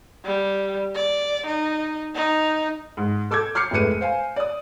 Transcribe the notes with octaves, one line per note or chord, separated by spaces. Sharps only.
G3
D5
D#4
D#4
G#2
A4 D6 E6 G6 G#6
D6 F6 G6 C7 C#7
F1 A2 G#3 B4 C#7 D#7
C5 F5 G#5
D5 D#6